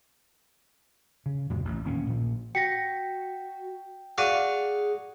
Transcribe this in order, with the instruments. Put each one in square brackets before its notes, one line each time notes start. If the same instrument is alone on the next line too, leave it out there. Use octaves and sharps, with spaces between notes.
[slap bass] C#3
F2 A2 C3 F3
A1
D#1 D2 A#3 C#4
A#2 F3
[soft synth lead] F#4 [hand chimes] G5 [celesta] A#6 B6 C#7
[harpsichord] F#4 D5 F5 [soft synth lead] G#4 [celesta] F#5 D#7